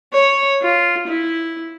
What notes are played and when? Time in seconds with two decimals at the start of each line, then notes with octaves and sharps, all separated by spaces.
0.12 C#5
0.62 F4
1.07 E4